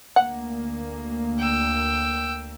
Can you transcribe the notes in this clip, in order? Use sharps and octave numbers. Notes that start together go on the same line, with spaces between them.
D2 A#3 F#5
G5 E6